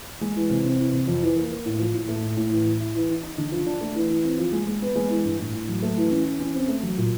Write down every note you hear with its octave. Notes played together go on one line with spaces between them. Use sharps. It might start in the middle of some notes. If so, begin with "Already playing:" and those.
G#3
E3
C3
C4
E3
C3
F2
E3
A#3
A#3
A2
F3
A2
A3
A2
A2
E3
E4
E4
E3
D#4
D#4
D3
F3
D4
A3
E3
E3
C4
F3
G#3
G#3
B3
G#3
E3
G2
A2
A2
F#3
A3
E3
C#4
E3
C#4
C4
A3
F#3
A#2